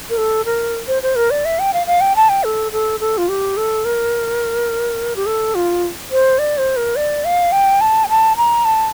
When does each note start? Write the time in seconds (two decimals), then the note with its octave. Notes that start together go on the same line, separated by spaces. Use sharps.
0.10 A#4
0.17 A4
0.45 A#4
0.88 C5
1.03 C5
1.16 A#4
1.31 D5
1.45 E5
1.59 G5
1.73 F5
1.87 F5
2.01 G5
2.16 A5
2.29 G5
2.44 A4
2.72 A4
3.00 A4
3.18 F4
3.29 G4
3.57 A4
3.85 A#4
5.16 G4
5.26 A4
5.55 F4
6.11 C5
6.39 D5
6.58 C5
6.77 A#4
6.96 D5
7.25 F5
7.52 G5
7.81 A5
8.04 G5
8.09 A5
8.37 A#5
8.65 A5